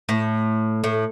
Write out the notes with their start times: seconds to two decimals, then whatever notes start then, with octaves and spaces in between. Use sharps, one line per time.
0.09 A2
0.84 A2